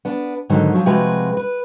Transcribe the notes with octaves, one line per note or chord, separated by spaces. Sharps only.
B3 D4
G#2 D3 D#3 F#3
F3 F#3
C3 F3 G#3 F#4 B4
B4